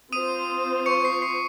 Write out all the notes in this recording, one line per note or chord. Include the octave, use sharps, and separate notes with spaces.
C4 F4 C5 D#6 D#7
C#6 C#7
C7
C7